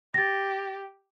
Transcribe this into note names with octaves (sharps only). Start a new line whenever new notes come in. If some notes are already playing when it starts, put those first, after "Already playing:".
G4 A6 A#6